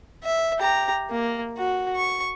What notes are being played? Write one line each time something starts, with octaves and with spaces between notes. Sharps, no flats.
E5
G4 A#5
A#3
F#4
C#6